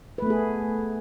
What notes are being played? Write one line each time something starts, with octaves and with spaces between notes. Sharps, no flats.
A3 B3 G#4 B4